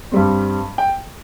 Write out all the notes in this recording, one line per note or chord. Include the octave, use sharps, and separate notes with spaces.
G2 G3 C4
G5